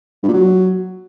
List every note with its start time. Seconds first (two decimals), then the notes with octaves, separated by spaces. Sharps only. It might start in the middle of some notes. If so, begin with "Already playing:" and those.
0.23 G2
0.28 A#2
0.33 F#3